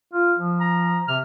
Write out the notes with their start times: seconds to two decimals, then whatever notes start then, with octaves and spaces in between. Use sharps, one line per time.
0.13 F4
0.38 F3
0.60 A#5
1.08 C3 F6